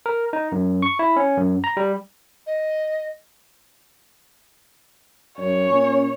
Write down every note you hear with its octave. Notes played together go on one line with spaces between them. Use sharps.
A#4
D#4
F#2
C#6
E4
C#4
F#2
A#5
G3
D#5
F#2 C#5
A#2 C#4